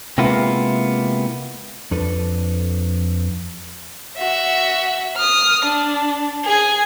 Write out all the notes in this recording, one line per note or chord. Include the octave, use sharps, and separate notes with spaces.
C3 G#3 A#3 B3 E4 F4
F2 D4 A4 B4
F#4 E5
D#6 F6
D4
G#4 G#5